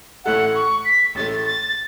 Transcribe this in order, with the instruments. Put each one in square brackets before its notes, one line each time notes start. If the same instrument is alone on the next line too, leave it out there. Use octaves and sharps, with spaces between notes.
[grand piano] A1 A2 A3 E4 A4 [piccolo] F#5
[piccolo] C#6
B6
[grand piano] A1 A2 A3 [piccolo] A6
[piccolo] A6
A6